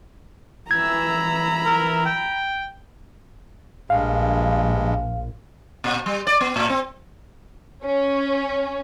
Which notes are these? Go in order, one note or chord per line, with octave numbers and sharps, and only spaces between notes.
E3 A#5 B5 E6 G#6
A#4
G5
A#1 G2 G#3 F5
A#2
G3
D5
B3
A2
C4
C#4